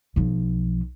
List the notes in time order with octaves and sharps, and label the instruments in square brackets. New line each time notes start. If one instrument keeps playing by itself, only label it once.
[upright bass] B1 F3